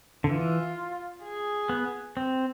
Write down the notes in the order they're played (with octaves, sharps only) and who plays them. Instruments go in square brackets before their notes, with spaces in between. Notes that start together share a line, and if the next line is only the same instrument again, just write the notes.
[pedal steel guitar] D3
[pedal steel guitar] E3 [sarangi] F4
[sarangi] G#4
[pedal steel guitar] B3
C4